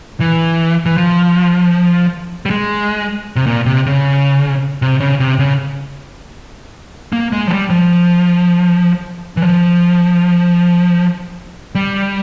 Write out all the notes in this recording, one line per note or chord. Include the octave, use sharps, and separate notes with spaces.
E3
E3
F3
G3
G#3
C3
A#2
C3
C#3
C3
C#3
C3
C#3
A#3
G#3
F3
G3
F3
E3
F3
G3